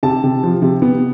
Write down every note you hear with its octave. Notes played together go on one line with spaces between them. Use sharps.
C3 A5
C3
F3
C3
B3